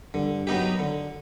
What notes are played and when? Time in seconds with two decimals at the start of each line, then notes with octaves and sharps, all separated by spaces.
0.14 G2 D3
0.47 F#3 B3 D#4 G4
0.79 D3